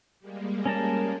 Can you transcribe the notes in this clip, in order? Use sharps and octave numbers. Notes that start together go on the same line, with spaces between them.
G3 G#3 A#3
C#4 A#4 A5